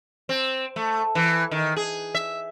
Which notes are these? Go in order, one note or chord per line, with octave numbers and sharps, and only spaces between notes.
C4
A3
E3
D#3
G#4
E5